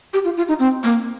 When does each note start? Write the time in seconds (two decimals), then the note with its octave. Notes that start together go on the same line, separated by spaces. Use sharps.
0.14 G4
0.25 F4
0.37 F4
0.48 D#4
0.60 C4
0.84 A#3